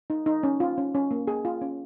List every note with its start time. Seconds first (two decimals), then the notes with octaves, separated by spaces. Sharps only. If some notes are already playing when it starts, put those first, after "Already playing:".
0.10 D#4
0.26 D#4
0.43 C#4
0.60 F4
0.78 C#4
0.95 C#4
1.11 A#3
1.27 G#4
1.45 F4
1.61 C#4